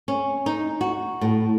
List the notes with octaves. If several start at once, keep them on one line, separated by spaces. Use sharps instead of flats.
C#4
D#4
F#4
A2